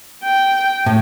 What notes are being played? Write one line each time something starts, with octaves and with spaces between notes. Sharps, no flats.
G5
A2